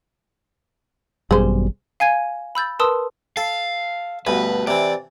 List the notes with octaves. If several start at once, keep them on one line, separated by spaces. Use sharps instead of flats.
G#1 F#2 B2 G3 G#4 C5
F5 G#5 G#6 D#7
B5 E6 G6 A6
A#4 B4 A5 C6 D#6 E6
A4 F5
D2 G2 B2 B4
C3 E3 D5